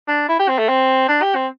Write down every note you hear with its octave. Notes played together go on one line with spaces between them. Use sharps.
D4
E4
G4
C4
A3
C4
D4
G4
C4